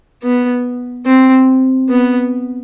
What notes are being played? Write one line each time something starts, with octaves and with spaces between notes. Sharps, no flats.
B3
C4
B3